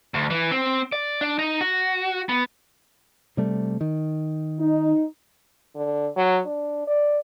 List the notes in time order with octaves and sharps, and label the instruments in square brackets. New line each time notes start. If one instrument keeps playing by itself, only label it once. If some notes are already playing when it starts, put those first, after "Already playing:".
[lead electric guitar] D2
E3
C4
D5
D4
D#4
F#4
B3
[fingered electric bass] C3 G3 A3
D#3
[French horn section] D#4
[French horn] D3
F#3
D4
D5